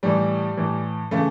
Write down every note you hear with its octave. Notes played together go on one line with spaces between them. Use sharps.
A2 E3 G3
A2 E3
C#3 E3 A3